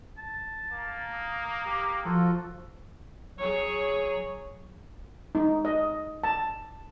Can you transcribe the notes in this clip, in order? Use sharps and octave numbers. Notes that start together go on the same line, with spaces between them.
A5
A#3
D#6
G4
F3 F4 F#4 A4
F#3 G#4 C#5
D#4
D#5
A5